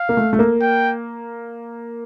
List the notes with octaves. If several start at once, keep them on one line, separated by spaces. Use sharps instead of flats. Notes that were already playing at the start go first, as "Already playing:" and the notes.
Already playing: F5
A#3
A3
A3
A#3
G5